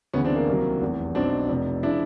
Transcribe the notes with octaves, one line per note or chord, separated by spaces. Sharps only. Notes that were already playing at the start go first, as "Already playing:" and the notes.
D2 C#3 E3 B3 C#4
C4 D4
A#3 C4
C2 C3 D#3 F#3
F1 E2 C3
B1 B2 F#3 C4 D4
F1 F2 C3
C#3 F3 D4 E4